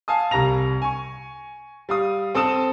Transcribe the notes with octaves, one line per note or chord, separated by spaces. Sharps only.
F5 G#5 A5 D#6
C2 G3 A#5 A#6 F7
G#5 C#6
G3 F5 D#6
C4 A4 A5 D#6 E7